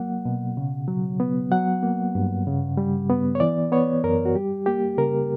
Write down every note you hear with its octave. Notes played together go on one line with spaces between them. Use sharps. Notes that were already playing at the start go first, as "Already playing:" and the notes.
Already playing: F#3 A#3 F#5
B2
C#3
F#3
B3
F#3 F#5
A#3
G2
C#3
G3
B3
C#5
E3 D5
B3 C#5
F#2 A#4
F#4
G3 G4
A#3 G4
C#3 A#4